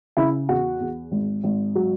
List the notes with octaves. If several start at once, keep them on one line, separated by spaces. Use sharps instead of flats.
C#3 E4 E5
E2 F#4 F#5
E2
G#1
G#1
F#3